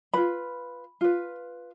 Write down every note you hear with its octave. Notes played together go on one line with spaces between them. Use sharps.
F4 B4 B5
F4 B4